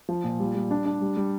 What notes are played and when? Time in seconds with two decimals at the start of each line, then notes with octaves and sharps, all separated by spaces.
0.09 F3
0.24 A#2
0.39 G3
0.55 G3
0.71 D4
0.85 D4
1.01 G3
1.17 G3